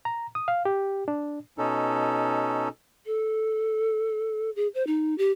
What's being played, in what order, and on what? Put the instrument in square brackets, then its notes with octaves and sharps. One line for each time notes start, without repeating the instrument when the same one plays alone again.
[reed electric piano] A#5
D#6
F5
G4
D4
[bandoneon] B2 C#4 D#4 A4
[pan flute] A4
G#4
C5
D#4
G4